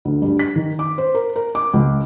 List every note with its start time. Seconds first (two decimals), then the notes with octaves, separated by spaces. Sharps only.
0.05 D2
0.22 G2
0.39 B6
0.56 D#3
0.79 D6
0.98 C5
1.15 A#4
1.36 A#4
1.55 D6
1.73 C#2